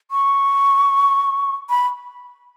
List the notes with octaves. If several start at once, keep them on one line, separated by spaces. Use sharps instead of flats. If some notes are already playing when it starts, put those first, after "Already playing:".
C#6
B5